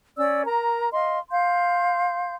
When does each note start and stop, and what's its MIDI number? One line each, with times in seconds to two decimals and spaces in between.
0.17 0.43 61
0.17 0.43 74
0.17 0.43 88
0.44 0.91 70
0.44 0.91 82
0.92 1.18 75
0.92 1.18 77
0.92 1.18 84
1.30 2.34 77
1.30 2.34 84
1.30 2.34 91